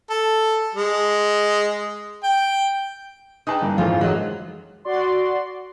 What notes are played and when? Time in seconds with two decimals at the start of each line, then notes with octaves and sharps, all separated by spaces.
0.10 A4
0.75 G#3
2.23 G5
3.47 D#4 G#4 B4 G5 A5 D#6
3.61 G2 E3 A#3
3.78 F#1 F2 G#2 D#3 E3 F4 C5
4.01 F#3 G#3 D#5
4.85 F#4 D5 C6